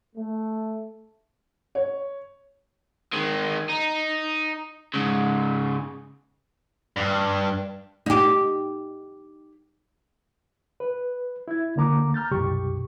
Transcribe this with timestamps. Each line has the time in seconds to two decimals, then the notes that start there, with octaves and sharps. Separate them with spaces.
0.15 A3
1.75 C#5
3.13 D#3 G#3
3.69 D#4
4.94 G#2 C#3
6.96 G2
8.06 D#4 G4
10.80 B4
11.48 E4 G#6
11.76 D2 D3 A#3 A#5 D6
12.14 A#5 F6 G6 A6
12.31 C2 F#2 B2 G4 C#6